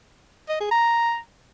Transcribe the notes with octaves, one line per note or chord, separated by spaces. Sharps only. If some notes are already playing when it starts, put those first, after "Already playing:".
D#5
G#4
A#5